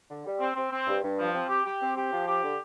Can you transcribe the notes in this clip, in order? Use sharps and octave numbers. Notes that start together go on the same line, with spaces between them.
D3
G3
C4
C4
C4
G2
G2
F3
C4
G4
G4
C4
G4
F3
G4
D3